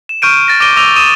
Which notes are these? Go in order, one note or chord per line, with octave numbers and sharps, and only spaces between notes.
E7
C#6 F6 G6 D7 D#7
A6 A#6
D6 A#6 D7 D#7 G7
D6 E6 A#6 D#7 F7 G7
D#6 D#7 E7